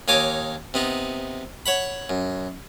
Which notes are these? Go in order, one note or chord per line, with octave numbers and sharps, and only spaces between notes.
D#2 D#4 C#5 G#5 D6
C3 B3 D#4
C#5 F#5 B5
F#2